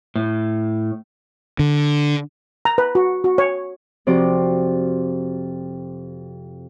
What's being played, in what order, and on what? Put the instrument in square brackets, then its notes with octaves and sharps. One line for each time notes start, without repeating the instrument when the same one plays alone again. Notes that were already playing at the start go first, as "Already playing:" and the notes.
[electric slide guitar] A2
[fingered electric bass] D3
[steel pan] A#5
B4
F#4
F#4
C#5
[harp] F2 C3 F3 F#4 D5